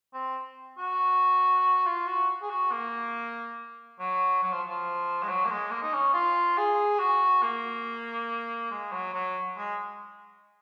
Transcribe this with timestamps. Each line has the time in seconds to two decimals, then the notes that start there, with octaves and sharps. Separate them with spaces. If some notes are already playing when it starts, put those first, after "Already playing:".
0.14 C4
0.78 F#4
1.86 F4
2.07 F#4
2.42 G#4
2.50 F#4
2.72 A#3
4.00 F#3
4.43 F#3
4.52 F3
4.69 F3
5.23 G#3
5.29 F#3
5.45 A#3
5.51 G#3
5.71 A#3
5.83 D#4
5.93 C#4
6.14 F4
6.58 G#4
6.99 F#4
7.43 A#3
8.71 G#3
8.92 F#3
9.14 F#3
9.57 G#3